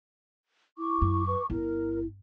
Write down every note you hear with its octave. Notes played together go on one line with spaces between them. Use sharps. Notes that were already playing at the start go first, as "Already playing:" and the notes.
E4 C#6 D6
F#2
B4
G1 E4 A#4